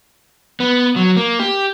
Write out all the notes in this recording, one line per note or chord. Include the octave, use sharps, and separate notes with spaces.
B3
F#3
A#3
G4